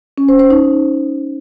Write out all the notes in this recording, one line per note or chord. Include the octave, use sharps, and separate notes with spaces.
C#4
C5
C5
D#4